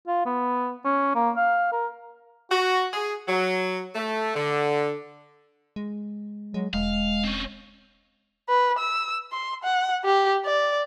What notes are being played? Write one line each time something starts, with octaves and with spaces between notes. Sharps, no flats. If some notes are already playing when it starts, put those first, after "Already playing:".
F4
B3
C#4
A#3
F5
A#4
F#4
G#4
F#3
A3
D3
G#3
F#3 G#3
E1 G#3 F5
C4 C#4
B4
E6
C6
F#5
G4
D5